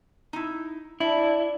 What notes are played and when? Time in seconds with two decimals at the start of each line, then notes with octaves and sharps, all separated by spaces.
0.33 D#4 E4
1.00 D4 E4